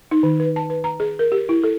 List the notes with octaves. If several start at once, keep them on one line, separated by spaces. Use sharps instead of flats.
D#4
D#3
B4
A5
B4
A#5
G#4
A#4
G4
E4
A4